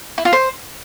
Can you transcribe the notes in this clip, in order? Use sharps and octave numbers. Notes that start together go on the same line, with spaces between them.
E4
F4
C5